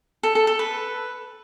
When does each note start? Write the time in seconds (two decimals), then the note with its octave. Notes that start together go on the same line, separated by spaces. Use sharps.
0.23 A4
0.35 A4
0.47 A4
0.59 B4